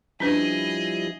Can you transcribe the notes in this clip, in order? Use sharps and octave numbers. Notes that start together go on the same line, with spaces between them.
F3 G3 C#4 D4 E4 G#4 B4 D#5